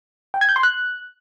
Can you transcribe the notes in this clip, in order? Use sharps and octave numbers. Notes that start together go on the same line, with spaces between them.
G5
G#6
G6
C6
F#6